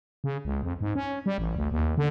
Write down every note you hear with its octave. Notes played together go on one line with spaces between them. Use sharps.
C#3
C#2
F2
G#2
C#4
G3
A1
D2
D#2
D3